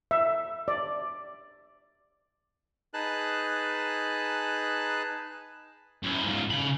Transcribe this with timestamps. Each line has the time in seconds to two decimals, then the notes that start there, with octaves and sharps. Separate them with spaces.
0.11 E5
0.68 D5
2.94 D#4 G#4 B4 A5 F#6
6.03 F#2 E4
6.24 G#2 F4
6.50 C#3 B5